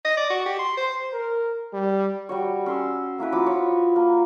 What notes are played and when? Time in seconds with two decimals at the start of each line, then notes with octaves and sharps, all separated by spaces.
0.05 D#5
0.17 D5
0.30 F#4
0.46 G4
0.59 C6
0.77 C5
1.13 A#4
1.73 G3
2.29 G3 F#4 C#5
2.66 C#4 C6 E6
3.18 A#3 C#4 E4 B4
3.32 F3 F#4 B5 D6
3.46 C#5
3.96 A#3